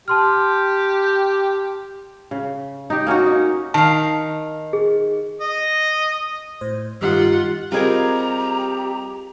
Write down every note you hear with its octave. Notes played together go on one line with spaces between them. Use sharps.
G4 A5 C6 F6
C#3
D#4 G4
A#3 C#4 D#4 F#4
D#4
D#3 F5 A5
G#4
D#5
A2 C5
G2 D#3 D#4 F4 G4 F#5
G3 C4 F4 G4 G#4 A#4 D#5 A#5